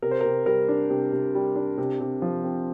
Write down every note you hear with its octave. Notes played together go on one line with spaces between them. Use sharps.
C3 A#4
C5
A#4
C3
G3 A#4
D4
C3
C3
G3
D4
C3
C3
F3
C4